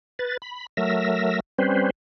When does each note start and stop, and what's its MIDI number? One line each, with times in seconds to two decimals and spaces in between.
0.19 0.37 71
0.19 0.37 93
0.42 0.66 83
0.77 1.40 54
0.77 1.40 57
0.77 1.40 70
0.77 1.40 76
0.77 1.40 88
0.77 1.40 94
1.58 1.90 55
1.58 1.90 60
1.58 1.90 61
1.58 1.90 71
1.58 1.90 72